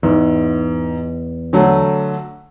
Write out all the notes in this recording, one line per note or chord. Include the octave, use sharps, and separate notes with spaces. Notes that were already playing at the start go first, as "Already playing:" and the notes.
E2 G#2
D3 F#3 A3